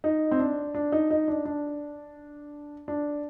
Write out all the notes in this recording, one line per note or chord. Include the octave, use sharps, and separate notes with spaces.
D#4
C4
D4
D4
D#4
D#4
D4
D4
D4